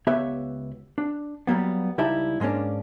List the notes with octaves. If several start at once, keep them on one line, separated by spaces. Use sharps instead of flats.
C#2 B3 G4 B4 C#5 E5
D4
F#3 G3 A#3 B3
C#2 G3 D#4 E4 G4 A5
G#2 G#3 A#3 C#4 D4